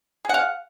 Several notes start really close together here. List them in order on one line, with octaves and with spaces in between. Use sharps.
G#4 F#5 F5